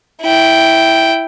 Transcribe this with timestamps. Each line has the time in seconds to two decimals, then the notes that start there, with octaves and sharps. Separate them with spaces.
0.22 E4 G5